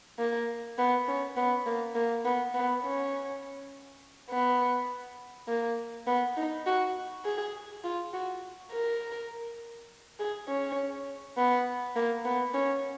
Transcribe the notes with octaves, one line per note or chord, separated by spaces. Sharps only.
A#3
B3
C#4
B3
A#3
A#3
B3
B3
C#4
B3
A#3
B3
D#4
F#4
G#4
F4
F#4
A#4
G#4
C#4
B3
A#3
B3
C#4